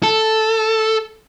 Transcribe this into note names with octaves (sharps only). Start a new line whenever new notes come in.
A4